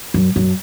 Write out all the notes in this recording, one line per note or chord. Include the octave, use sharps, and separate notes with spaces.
F#2
F#2